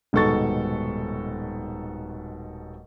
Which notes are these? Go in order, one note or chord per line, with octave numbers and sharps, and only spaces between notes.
D#1 G#2 B2 A4 C#6 A6